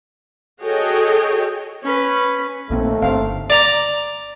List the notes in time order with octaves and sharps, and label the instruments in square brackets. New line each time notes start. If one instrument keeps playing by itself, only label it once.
[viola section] F#4 G#4 A4 C#5 D#5 G5
[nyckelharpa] C#4 B4
[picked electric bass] A#1 A#3 C4 [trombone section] D#2 A3
[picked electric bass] G1 D3 [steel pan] C4 F5
[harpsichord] D5 A#5